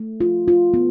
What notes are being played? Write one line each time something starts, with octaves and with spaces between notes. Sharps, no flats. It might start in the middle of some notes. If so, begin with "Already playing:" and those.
Already playing: A3
F4
F4
B3